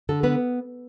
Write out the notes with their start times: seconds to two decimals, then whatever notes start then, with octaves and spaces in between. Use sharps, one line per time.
0.09 D3 A4
0.23 B3 B4